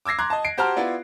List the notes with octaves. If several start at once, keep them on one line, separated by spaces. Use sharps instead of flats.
D6 E6 G#6 A#6 C7
A#5 C6 D6 F#6 G#6
D#5 A5
C7 D7
F#4 G4 C5 A5 A#5 F6
B3 E4 F4 D5